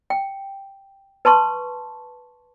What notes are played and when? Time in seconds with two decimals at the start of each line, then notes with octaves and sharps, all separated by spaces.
0.10 G5
1.25 B4 A5 C6 C#6